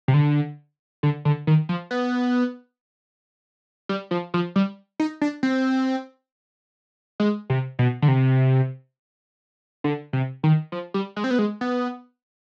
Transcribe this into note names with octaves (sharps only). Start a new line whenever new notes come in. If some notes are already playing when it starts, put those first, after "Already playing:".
C3
D3
D3
D3
D#3
F3
B3
G3
F3
F3
G3
D#4
D4
C4
G#3
C3
B2
D3
C3
D3
C3
D#3
F3
G3
G#3
C4
B3
G#3
B3